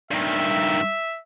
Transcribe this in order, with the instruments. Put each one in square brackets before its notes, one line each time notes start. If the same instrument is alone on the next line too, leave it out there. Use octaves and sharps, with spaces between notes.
[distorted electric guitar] G2 D#3 [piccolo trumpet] E5